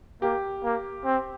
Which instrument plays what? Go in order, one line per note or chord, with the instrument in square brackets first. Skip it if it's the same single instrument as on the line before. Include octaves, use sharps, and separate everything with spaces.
[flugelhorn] A#3 [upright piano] G4
[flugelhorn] A#3
C4